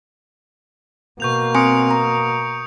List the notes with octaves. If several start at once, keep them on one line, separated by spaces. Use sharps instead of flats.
B2 A#3 C#6 G6 F7
C4 G#5 C6 D#6 C#7 D7
A#5